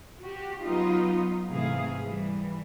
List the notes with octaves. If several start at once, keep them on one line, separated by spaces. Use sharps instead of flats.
F#4 G4
F#3 B3 D#4 F4
G#2 C3 E3 A3 G#4 F5
E3 G3